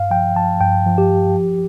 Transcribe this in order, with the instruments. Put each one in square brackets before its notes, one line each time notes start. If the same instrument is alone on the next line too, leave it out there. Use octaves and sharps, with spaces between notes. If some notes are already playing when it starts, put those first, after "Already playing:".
Already playing: [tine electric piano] G2 F5
F3 G5
F3 A5
G2 G5
F3
G4
F3
F3